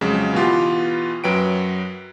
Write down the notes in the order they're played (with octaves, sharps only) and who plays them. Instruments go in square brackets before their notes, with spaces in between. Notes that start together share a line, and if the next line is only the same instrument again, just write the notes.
[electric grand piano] F2 C#3 F#3 G#3
B2 E3 B3 F4 G4
F#2 F#3 B4 G5 D7